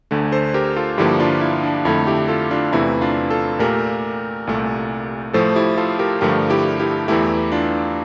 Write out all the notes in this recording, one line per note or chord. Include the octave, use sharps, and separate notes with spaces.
D2 D3 A3
A4 C5
G4 A#4
F4 A4
G2 D3 F3 A#3 E4 G4
D4 F4
E4
D4
F2 D3 A3 E4
E4 G4
F4 A4
D4 F4
E2 C3 E3 A3 E4
D4 F4
F4 A4
A#2 A3 G4 A#4
C2 A#2 A3
A2 F3 A3 A4 C5
E4 G4
F4 A4
G4 A#4
G2 D3 F3 A3 G4 A#4
E4 G4
E4 G4
E2 E3 A3 E4 G4
D4 F4